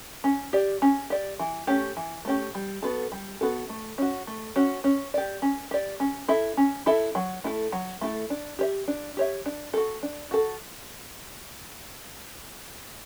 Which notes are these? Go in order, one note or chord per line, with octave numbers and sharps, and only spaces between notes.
C#4
G4 D5
C#4
G4 D5
E3
A3 C#4 G4
E3
A3 C#4 G4
G3
B3 F#4 A4
G3
B3 F#4 A4
A3
C#4 F#4
A3
C#4 F#4
C#4
G4 D5
C#4
G4 D5
C#4
E4 A4 E5
C#4
E4 A4 E5
F#3
A3 E4 A4
F#3
A3 E4 A4
D4
G4 C#5 E5
D4
G4 C#5 E5
D4
F#4 A4
D4
F#4 A4